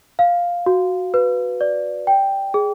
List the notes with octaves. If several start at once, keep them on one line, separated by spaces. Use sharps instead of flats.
F5
F#4
B4
D5
G5
G#4